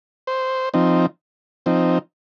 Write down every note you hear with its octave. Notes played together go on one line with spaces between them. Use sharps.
C5
F3 C4 D#4
F3 C4 D#4